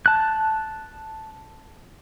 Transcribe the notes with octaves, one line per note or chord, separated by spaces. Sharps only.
A5 F#6